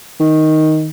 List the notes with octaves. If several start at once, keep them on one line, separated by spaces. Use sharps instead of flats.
D#3